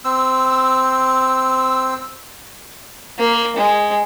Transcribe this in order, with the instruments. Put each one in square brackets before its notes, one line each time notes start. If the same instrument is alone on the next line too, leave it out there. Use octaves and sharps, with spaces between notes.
[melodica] C4 E6
[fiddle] A#3
G#3